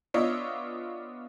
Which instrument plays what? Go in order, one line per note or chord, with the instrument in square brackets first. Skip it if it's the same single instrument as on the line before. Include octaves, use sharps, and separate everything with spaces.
[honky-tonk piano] B3 D4 F4 C#5 D#5 E5